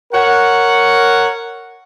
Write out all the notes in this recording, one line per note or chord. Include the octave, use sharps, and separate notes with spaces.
A#4 C#5 F#5